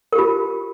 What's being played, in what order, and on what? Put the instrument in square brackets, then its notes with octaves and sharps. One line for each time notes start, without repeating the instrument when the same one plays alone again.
[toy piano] A#4
G4
F4